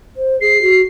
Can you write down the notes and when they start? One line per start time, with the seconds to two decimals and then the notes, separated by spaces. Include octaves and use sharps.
0.17 C5
0.41 G#4 C7
0.62 F#4